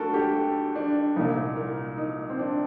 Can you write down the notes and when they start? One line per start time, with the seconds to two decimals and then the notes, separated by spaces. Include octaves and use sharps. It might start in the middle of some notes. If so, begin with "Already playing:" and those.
Already playing: D2 D3 D4 F#4 A4 A#4
0.14 G4
0.76 D4
1.16 C2 A#2 D#4
1.57 A#4
1.98 D#4
2.29 C4
2.39 D4